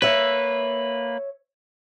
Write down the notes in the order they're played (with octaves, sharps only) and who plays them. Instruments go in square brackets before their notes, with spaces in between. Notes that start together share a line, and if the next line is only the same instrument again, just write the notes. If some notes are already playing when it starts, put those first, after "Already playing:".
[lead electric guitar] A#3 B4 [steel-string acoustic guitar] C#5 E5